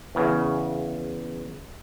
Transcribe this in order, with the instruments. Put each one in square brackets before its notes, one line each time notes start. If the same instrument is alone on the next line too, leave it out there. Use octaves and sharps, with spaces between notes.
[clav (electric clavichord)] E2 C#3